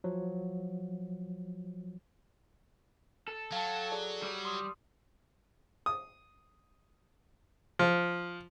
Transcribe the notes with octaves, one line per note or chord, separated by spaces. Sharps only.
F3 F#3
A4
F#3 F5 G5 A5
G#4 A4 D5
G3
C6 D#6
D#6
F3